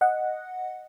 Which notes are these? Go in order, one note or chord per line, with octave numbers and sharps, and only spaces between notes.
D#5 F#5